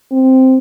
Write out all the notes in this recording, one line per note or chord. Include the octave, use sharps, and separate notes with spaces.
C4